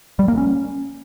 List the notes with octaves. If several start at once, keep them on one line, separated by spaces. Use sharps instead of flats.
G3
A#3
C#4